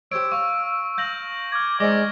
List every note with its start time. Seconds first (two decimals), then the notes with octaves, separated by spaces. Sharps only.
0.12 G4 C5 C#5 E6 D7
0.32 F5 C#6
0.98 F5 G6 A#6 F#7
1.52 D6 F6 G#6
1.80 G#3 C4 D#4 D5 D6 A#6 G7